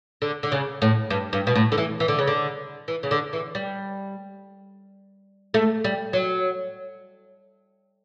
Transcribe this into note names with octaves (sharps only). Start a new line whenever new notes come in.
D3
D3
C#3
A2
G2
G2
B2
A2
D3
E3
E3
D3
C#3
D3
E3
C#3
D3
E3
G3
A3
G3
F#3